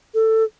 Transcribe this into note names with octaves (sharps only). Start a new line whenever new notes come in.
A4